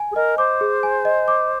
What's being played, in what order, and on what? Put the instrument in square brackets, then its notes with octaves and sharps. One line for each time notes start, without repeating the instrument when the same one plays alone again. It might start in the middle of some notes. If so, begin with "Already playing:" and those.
Already playing: [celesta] G#5
[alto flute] G#4
[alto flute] A#4 [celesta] D#5
[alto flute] C5 [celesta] D6
[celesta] G#4
G#5
D#5
D6